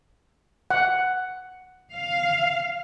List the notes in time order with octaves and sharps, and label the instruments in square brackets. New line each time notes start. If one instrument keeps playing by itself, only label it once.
[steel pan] F#5
[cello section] F5